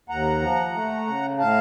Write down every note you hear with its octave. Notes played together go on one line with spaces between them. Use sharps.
D#2 F#5 A#5
F3
A3
C#3
A2 F5 A5